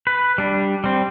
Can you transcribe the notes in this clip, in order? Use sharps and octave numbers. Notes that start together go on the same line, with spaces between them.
B4
G3 D4
G3 C4